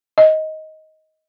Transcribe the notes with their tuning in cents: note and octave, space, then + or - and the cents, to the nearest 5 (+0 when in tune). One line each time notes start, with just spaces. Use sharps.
D#5 +15